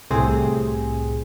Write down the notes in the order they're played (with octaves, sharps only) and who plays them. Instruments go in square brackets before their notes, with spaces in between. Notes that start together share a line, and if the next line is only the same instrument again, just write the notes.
[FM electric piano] C2 A2 C3 C4 G#4